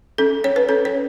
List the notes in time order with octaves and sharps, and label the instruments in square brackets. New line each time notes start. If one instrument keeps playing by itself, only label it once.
[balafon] C#4 A4
C#4 C#5
B4
C#4 A4
C#5